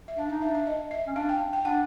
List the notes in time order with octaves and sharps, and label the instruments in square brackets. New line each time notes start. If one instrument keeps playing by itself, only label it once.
[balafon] E5
[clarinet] D4 [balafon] F5
[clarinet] D#4 [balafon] F5
[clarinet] D4 [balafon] E5
[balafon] E5
D#5
E5
[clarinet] C#4
[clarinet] D4 [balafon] F5
[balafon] G5
G5
[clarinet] D4 [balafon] F#5